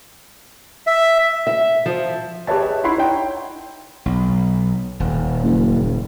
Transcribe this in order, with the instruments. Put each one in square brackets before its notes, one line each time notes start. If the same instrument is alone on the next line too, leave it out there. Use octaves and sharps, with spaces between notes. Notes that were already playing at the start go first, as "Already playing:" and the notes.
[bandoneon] E5
[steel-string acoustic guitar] E5
F3
[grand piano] G4 G#4 B4 C#5 E5 A5
E5
D#4 E4 F#5 B5 C6
D#4 C#5 G5
[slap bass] B1
D#1
[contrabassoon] F#1